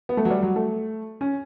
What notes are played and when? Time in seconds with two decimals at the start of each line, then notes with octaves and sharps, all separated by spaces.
0.09 B3
0.17 A3
0.25 F#3
0.30 G3
0.43 F#3
0.56 A3
1.21 C#4